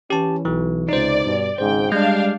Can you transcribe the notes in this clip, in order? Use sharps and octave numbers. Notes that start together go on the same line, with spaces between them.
E3 C#4 G4 A5
B1 E3
C#2 C3 D#4 C5 D5
G2 B2
G#1 G#2 C#3 C5 G5
G3 G#3 D4 F5 G6